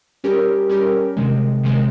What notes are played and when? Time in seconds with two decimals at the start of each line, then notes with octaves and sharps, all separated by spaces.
0.24 G3 C#4 G4 A#4
0.70 G3 C#4 G4 A#4
1.17 C3 D#3 G#3
1.64 C3 D#3 G#3